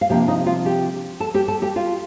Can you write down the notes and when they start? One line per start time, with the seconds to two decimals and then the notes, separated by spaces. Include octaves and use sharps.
0.01 F5
0.09 C3 F3 A#3 D4 G4 G5
0.28 D#4 D#5
0.46 F4 F5
0.65 G4 G5
1.20 A4 A5
1.34 G4 G5
1.48 A4 A5
1.62 G4 G5
1.76 F4 F5